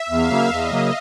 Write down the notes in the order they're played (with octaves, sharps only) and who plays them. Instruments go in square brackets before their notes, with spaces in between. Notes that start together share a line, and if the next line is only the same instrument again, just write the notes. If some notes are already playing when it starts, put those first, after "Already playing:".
Already playing: [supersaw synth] E5
[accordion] E2 [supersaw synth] F5
[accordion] C#3 F#3 A#3
[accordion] E2 [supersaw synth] D#5
[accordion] C#3 F#3 A#3